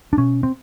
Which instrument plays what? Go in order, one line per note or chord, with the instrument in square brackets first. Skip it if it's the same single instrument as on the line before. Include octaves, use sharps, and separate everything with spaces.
[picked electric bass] D4
B2 C#4
C4